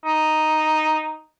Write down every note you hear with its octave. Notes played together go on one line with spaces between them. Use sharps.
D#4